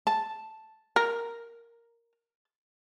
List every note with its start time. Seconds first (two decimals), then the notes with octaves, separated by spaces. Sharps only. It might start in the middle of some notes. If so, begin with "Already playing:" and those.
0.07 A5
0.96 A#4